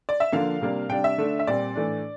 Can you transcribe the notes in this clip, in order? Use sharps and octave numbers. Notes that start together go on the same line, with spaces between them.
D5
E5
D3 F3 A#3 D4 F5
C3 G3 A#3 D4
C3 G3 D4 G5
E5
D3 A3 D4
E5
A#2 G3 C4 D5
A2 E3 A3 D4